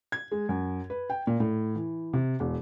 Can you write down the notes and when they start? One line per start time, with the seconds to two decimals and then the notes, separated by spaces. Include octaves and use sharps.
0.12 G#6
0.31 G#3
0.49 F#2
0.90 B4
1.10 G5
1.27 A#2
1.40 A2
1.75 E3
2.13 C3
2.40 E1